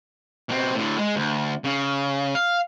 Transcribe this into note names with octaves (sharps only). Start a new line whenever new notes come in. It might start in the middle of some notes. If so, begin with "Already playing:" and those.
B2 C4
A2 D3
G#3
D2
C#3
F5